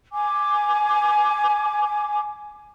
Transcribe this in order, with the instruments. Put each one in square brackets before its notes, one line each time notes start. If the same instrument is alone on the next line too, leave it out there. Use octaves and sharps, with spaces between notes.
[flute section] G#5 D6